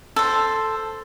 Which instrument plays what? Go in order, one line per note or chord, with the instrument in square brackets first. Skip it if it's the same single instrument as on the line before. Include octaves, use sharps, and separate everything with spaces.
[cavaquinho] A4 C5